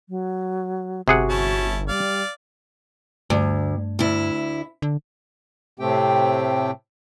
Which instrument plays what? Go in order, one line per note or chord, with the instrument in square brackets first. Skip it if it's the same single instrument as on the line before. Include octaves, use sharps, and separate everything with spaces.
[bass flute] F#3
[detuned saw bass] G1 [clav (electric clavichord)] C3 G#4 F#5 [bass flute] F#4
[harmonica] C#4 E4 A5
[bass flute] G3 [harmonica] D5 F5
[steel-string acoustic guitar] D2 [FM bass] G2
[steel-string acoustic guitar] D2 E4
[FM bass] D3
[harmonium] A2 C3 A3 C4 G4 G5